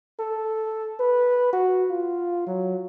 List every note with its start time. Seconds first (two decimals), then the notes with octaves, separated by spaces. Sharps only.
0.19 A4
1.00 B4
1.53 F#4
1.90 F4
2.47 F#3